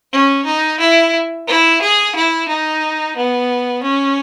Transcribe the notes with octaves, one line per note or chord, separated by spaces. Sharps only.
C#4
D#4
E4
E4
G#4
E4
D#4
B3
C#4